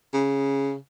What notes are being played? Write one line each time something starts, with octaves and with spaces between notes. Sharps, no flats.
C#3